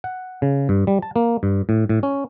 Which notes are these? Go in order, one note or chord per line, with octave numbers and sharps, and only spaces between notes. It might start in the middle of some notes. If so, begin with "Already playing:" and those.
F#5
C#3
G2
G3
A5
A#3
G2
A2
A2
C#4